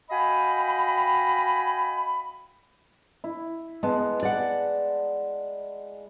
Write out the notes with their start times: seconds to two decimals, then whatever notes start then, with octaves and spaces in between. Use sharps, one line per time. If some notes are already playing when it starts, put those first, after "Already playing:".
0.10 F#4 D#5 F5 G5 G#5 B5
3.24 E4
3.83 G#3 B3 A5
4.23 D5 F#5